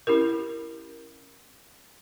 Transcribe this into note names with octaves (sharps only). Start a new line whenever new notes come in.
C#4 E4 G4 A#4